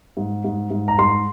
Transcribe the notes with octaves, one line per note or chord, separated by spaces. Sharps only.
G#2
G#2
G#2
A#5
G#2 C6